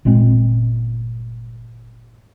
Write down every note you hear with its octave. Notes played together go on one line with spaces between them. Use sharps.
G1 A#2 G#3 C4